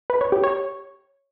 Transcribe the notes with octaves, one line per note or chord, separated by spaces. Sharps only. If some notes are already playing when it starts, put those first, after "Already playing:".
B4
C#5
G4
C#5